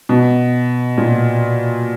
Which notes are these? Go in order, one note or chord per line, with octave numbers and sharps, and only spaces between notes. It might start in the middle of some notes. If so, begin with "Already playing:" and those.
B2
A#2